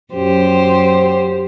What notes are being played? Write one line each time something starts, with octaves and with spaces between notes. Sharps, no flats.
F#2 G4 C5